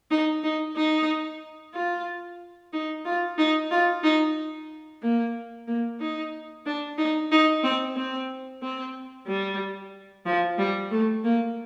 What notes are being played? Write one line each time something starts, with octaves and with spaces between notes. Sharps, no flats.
D#4
D#4
D#4
F4
D#4
F4
D#4
F4
D#4
A#3
A#3
D#4
D4
D#4
D#4
C4
C4
C4
G3
F3
G3
A3
A#3